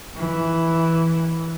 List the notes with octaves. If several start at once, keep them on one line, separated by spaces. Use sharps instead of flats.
E3